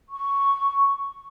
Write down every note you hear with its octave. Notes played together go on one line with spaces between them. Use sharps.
C#6